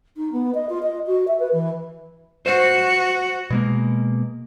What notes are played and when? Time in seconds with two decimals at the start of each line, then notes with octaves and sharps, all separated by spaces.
0.17 D#4
0.32 B3
0.54 D#5
0.69 F4
0.82 D#5
1.06 F#4
1.27 E5
1.39 B4
1.52 E3
2.46 F#4 C5
3.50 B2 G#3 A#3